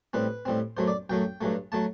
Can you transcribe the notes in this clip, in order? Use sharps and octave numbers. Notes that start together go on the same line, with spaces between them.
A2 G3 C4 B4
A2 G3 C4
F#2 F#3 A3 C5
D5
F#2 F#3 A3 G5
G2 F#3 A3
F#3 A3 A5